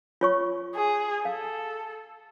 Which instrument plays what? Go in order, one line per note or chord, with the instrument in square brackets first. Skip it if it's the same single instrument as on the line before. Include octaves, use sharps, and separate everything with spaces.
[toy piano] F4 C#5 C#6
[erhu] G#4
[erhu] A4 [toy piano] F5